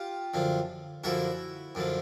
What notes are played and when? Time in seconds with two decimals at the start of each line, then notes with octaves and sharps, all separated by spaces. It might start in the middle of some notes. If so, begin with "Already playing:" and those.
Already playing: F4 G4
0.34 F#2 D3 F3
1.04 F#2 D3 F3 E4 F#4
1.75 F#2 D3 F3